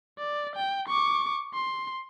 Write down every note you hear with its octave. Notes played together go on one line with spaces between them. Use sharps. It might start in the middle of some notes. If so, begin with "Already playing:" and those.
D5
G5
C#6 D6
C6